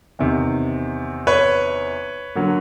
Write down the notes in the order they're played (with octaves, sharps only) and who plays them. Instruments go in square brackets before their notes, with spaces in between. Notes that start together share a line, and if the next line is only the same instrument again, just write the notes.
[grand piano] E2 C3 D#3
B4 C#5
D3 F#3 A#3